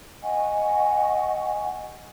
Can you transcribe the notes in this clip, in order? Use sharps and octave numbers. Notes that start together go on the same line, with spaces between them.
D#5 F#5 G#5 C#6